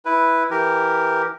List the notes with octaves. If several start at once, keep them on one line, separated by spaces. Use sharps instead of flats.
E4 B4
E3 G4 A#4